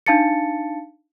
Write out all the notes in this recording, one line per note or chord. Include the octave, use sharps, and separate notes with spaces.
D4 D#4 F5 A5 A6 C#7